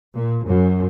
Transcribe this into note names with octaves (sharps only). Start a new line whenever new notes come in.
A#2
F#2